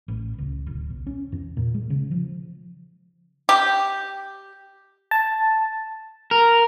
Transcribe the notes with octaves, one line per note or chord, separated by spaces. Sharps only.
A1
C#2
D1
B1
C#4
E2
A#2
G#3
C#3
F3
G4
A5
A#4